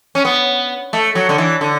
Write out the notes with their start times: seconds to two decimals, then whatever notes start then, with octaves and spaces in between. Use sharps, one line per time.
0.15 C#4
0.25 B3
0.93 A3
1.15 F#3
1.29 D3
1.38 E3
1.61 D3